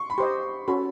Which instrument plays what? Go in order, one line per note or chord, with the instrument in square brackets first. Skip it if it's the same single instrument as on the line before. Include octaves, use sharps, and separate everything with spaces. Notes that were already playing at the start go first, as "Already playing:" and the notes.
Already playing: [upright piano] C6 C#6
B5
[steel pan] G4 C5 D#5 [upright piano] C6
[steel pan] C#4 F#4 A4 [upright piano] B5